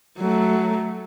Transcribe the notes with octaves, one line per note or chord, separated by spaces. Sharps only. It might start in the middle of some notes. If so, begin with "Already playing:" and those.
F#3 A3